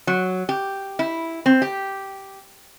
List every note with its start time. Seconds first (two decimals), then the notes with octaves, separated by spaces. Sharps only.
0.07 F#3
0.49 G4
0.99 E4
1.46 C4
1.62 G4